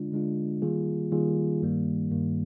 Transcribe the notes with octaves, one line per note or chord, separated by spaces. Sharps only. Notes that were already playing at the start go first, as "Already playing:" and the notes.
Already playing: D3 G#3 D4 F4
D3 G#3 D4 F4
D#3 G3 A#3 F4 G#4
D#3 G3 A#3 F4 G#4
G2 D#3 G3 A#3
G2 D#3 G3 A#3